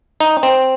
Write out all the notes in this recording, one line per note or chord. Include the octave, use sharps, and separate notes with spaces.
D#4
C4